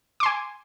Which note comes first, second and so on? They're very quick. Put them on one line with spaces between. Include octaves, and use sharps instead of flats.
D6 C6 G#5